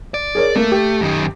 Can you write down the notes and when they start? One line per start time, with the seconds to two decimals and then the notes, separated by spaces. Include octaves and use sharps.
0.14 D5
0.35 G#4 A#4 C#5
0.56 A3 A#3
0.72 G4
1.01 F#2 D#3